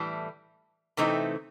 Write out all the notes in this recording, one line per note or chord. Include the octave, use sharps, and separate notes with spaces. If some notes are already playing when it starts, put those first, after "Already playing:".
Already playing: A2 E3 G3
C3 E3 A3 C4 D#4